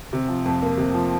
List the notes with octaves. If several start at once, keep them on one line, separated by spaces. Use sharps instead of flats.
C3
F3
F2
A#3
C3
F3